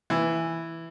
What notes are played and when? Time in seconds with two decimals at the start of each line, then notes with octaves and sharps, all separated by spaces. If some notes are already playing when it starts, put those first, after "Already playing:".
0.10 E3